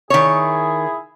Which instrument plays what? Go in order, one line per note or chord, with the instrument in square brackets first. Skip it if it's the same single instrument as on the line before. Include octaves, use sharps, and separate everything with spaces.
[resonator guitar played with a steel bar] D#3 C#5 [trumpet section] E4 G#4